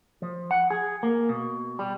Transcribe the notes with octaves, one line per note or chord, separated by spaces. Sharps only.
F3
F#5
G#4
A#3
B2
G3